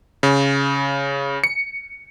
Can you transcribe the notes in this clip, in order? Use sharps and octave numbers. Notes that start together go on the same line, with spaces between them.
C#3
C#7